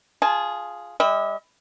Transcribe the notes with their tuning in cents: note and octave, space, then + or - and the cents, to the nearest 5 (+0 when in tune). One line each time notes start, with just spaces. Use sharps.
F4 +0 G#4 +0 A5 -25
G3 +35 E5 -40